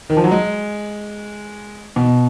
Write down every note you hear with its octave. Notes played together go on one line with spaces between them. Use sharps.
D#3
F3
F#3
G#3
B2